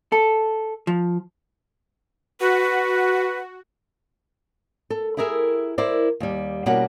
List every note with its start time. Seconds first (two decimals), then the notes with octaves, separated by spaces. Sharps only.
0.12 A4
0.87 F3
2.40 F#4 B4
4.90 A4
5.17 E4 G4 G#4 A#4 E5
5.78 E4 A#4 C5 D5
6.20 D#2 G3
6.66 B2 G3 A#3 C#4 F#4 F#5